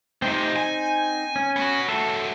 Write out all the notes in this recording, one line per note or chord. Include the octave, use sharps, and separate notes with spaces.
F2 C3 C4 D#4
G#5
C#4
B3 F#4
F#3 A3 A4